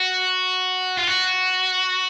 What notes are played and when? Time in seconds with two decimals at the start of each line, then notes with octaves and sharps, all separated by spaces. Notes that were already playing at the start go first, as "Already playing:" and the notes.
Already playing: F#4
0.97 F4
1.07 F#4